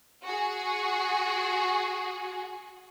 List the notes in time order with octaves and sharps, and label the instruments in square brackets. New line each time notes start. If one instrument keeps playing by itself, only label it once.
[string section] F#4 G#4